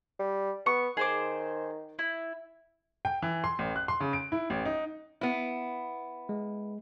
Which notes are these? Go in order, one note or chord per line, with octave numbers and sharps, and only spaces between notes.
G3
B3 C#6
D#3 G#4 C5 D6
E4
G5
E3
C6
A1
F#6
C6
C#3
D7
E4
A1
D#4
B3 E4
G#3